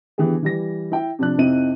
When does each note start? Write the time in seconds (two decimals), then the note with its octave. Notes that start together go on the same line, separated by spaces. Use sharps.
0.18 D3 E3 B3 G4 G#4
0.43 E3 G3 A#6
0.92 E4 G5
1.19 C3 F3 D4 F#6
1.38 F2 C3 C4 D#4 E4 D#7